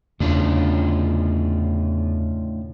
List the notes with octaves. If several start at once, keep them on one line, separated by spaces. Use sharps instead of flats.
E2 A2 C#3 D4 F4